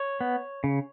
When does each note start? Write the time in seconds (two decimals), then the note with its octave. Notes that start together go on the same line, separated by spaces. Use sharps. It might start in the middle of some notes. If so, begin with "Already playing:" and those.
Already playing: C#5
0.21 B3
0.64 C#3